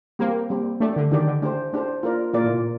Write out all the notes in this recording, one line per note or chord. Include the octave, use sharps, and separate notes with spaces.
G3 A#3 C4 G4
G3 C4 G4
A3 D4 G4 D5
D3
D#3 D4 G4 D5
D3
A3 D4 G4 C5
A3 D4 G4 C5
A#3 F4 A#4 D5
A#2 A#3 F4 A#4 D5
A2
A#2